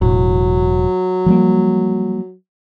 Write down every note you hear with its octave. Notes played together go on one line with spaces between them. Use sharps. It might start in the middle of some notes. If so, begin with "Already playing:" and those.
E1 A2 F#3
F3 G3 A#3